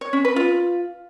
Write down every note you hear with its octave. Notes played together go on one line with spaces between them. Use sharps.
C#5
C#4
B4
F4